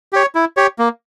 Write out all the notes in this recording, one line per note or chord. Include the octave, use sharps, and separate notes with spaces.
G4 C#5
E4
G4 C#5
A#3